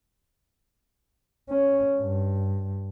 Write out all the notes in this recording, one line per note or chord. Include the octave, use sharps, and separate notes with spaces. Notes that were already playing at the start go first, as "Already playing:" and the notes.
C#4
G2